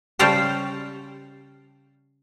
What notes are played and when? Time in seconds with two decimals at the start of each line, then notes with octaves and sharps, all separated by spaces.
0.19 C#3 G3 C5 F5 G5 A5